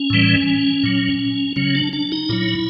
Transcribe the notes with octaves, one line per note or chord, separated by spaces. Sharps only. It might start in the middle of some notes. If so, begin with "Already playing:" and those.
Already playing: C#4
A2 E3 G3
A#2 F#3
C#3 F#3 C#4
D4
D4
D#4
A#2 F#3 E4